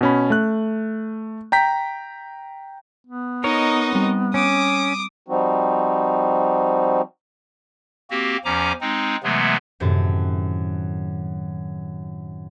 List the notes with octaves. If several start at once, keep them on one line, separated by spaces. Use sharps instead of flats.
B2 C#4 B5
A3 F#6
G5 A#5 G6 B6
B3
D#4 A#4 C#5 D#5
G3 C4
C#4 D6 D#6
F3 G3 C4 D#4 F#4
A#3 C4 F#4 G4
E2 F3 C#4 G#5 A#5 D6
G#3 C4 D#4
C3 E3 F#3 G#3 A3 B3
F#2 A2 C3 D#3 A3 C4